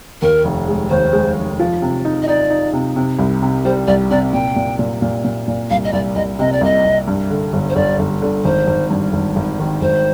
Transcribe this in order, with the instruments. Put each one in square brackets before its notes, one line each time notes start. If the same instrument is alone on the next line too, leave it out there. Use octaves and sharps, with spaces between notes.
[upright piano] D#2 [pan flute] A#4
[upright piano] F1
G#3
[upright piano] D#2 [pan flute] C5
[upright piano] G#3
F1
F3
C3
D#4
[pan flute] D#5
[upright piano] D#4 [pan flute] D5
[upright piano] D#4
C3
C3
C2
C3
[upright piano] G3 [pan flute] C5
[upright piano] C2 [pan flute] D5
[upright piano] C3 [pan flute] D5
[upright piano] A#2 [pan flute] G5
[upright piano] A#2
A#2
A#2
A#2
A#2
[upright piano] C2 [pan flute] F5
[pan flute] D#5
[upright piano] C2 [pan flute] D5
[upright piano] C2 [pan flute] D#5
[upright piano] C3 [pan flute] D#5
[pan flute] D5
[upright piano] C2 [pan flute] D#5
[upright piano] C2
G2
D3
G1
[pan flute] C5
[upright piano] G1 [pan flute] D5
[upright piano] G1
D3
[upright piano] G#1 [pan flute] C5
[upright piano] G#1
G2
G#1
G#1
D#3
[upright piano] G#1 [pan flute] C5